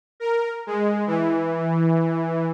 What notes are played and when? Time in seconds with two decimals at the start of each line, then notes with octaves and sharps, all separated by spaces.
0.20 A#4
0.67 G#3
1.07 E3